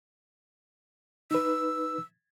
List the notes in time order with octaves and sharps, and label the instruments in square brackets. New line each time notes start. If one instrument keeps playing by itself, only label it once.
[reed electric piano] D#4 B4 [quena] E6